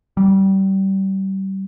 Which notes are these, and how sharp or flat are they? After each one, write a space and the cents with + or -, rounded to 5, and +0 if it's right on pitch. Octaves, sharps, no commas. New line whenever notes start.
G3 -25